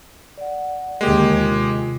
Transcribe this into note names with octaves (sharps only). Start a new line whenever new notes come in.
D5 F#5
D#2 D3 G#3 A#3 G4 A#4 G5
C3 F4